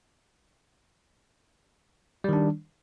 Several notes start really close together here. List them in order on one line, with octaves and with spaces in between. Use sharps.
G3 D#3 D4